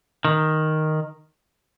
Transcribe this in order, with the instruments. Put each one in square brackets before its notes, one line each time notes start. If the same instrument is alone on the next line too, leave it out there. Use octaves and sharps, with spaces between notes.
[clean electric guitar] D#3